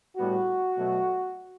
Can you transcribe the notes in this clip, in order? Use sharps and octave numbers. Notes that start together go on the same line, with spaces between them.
A2 G3 B3 F#4
B2 F#3 A3